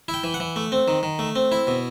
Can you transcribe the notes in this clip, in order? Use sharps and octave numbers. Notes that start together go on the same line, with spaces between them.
E4
G5
E3
F#5
E3
A3
C4
D#3
D#3
A3
C4
E4
B2